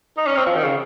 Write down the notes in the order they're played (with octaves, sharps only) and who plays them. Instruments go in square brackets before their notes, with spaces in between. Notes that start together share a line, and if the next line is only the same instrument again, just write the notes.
[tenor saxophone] D#4
C#4
C4
F3
D#3
C#3